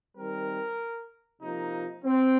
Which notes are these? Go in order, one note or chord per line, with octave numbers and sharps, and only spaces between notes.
D#3 G3 C4 A#4
C3 F3 A#3 D#4
C4